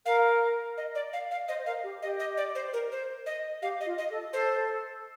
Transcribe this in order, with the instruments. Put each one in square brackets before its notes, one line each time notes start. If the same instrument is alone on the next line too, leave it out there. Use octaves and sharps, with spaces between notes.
[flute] A#4 [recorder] F5
[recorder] D#5
D5
F5
F5
[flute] C5 [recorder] D#5
[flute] C5
[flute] A#4 [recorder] F5
[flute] G4
[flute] G4 [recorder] D#5
[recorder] D#5
D5
C5
A#4
C5
D#5
[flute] G4 [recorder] F5
[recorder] D#5
[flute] F4
[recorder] D#5
[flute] A4
[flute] A4 [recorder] C5